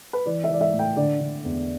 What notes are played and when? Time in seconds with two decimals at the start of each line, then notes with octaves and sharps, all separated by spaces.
0.13 B4
0.26 E3 D5
0.44 E5
0.50 E3 D5
0.61 E5
0.73 A2
0.79 G5
0.97 D3 D5
1.21 D3
1.44 E2